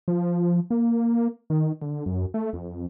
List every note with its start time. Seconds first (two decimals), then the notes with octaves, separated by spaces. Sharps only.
0.08 F3
0.71 A#3
1.50 D#3
1.82 D3
2.06 F#2
2.34 A3
2.53 F2